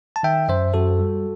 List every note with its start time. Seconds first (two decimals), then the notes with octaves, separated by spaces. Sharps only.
0.16 A5
0.23 D#3 E5 G5
0.49 F#2 C5 E5
0.74 F#2 F#4 A4
0.99 G3